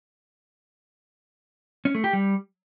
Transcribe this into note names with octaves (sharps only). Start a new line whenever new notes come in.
C#4
A3
G4
G3